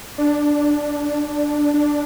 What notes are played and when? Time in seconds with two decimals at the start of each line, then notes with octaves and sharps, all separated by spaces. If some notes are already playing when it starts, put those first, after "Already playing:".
0.18 D4
1.74 D4